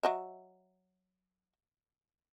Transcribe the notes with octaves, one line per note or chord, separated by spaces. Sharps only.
F#3 D#5 E5